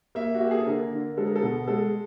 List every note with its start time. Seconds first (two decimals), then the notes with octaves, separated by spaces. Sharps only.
0.15 A#3 E5
0.34 F#4
0.41 A#3 G4
0.51 G#4
0.59 A4
0.66 D3 A#4
0.92 D3
1.17 G#3 A4
1.26 A#4
1.36 A4
1.43 B2
1.68 G#3 A4